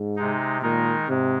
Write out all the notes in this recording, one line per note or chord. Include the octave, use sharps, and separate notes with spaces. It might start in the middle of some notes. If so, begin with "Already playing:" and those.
Already playing: G#2
C3 G#3 D#4
A#2 D#3 G#3 D#4 A#4
G#2 C3 G#3